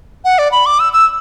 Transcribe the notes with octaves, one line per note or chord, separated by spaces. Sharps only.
F#5
D5
B5
D6
E6
E6